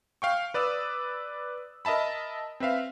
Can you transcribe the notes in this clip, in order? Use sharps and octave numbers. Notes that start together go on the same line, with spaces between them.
F5 G5 C#6
B4 D5 D#6 E6
A#4 D#5 E5 A5 B5
C4 B4 E5 F5